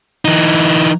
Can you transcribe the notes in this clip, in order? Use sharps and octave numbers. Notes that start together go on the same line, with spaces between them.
E3 D#4